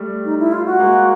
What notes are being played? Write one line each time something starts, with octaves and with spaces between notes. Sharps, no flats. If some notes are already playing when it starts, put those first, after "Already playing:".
Already playing: G3 A3
D#4
E4
F4
F#4
G#3 A#3